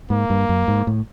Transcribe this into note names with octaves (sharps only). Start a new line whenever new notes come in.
G#2 A#3
G2
F#2
G#2
A2